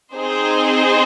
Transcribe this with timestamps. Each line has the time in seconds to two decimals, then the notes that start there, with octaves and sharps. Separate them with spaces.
0.14 C4 D#4 G#4 C5